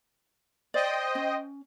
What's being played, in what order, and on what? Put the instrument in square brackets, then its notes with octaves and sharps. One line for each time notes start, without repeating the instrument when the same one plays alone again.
[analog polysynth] C5 D#5 G5 [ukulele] D5
[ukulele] C#4